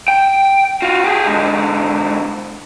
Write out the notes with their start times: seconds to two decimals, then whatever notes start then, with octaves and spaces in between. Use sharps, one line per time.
0.08 G5
0.82 F4 F#4
1.04 G4 G#4
1.26 G#2 D3